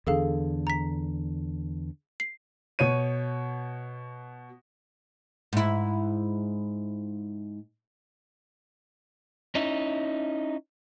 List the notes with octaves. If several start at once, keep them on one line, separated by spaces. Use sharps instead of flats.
E2 D3 G#4 A4 F5
A#5 B6
C7
B2 C#5 D#7
G#2 E4
C#4 D#4 E4